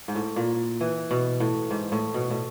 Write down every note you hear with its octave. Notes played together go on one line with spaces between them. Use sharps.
G#2
A2
A#2
E3
B2
A2
G#2
A2
B2
A2